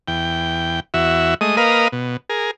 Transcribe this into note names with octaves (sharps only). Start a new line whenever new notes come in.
E2 G5
E2 F#4 E5
G#3 A3 D#5 D#6
A#3 A#4 B4 D#5 F5 D#6
B2
G#4 A#4